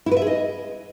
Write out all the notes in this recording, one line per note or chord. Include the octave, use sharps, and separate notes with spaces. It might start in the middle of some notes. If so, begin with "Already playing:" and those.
E4
B4
E5
G#4
D#5